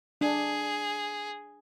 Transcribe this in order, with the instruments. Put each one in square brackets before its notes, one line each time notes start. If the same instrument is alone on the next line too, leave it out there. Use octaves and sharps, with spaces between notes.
[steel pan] D4 [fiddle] G#4